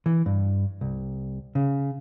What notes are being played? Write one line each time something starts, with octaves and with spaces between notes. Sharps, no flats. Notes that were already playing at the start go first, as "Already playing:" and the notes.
E3
G2
C2
C#3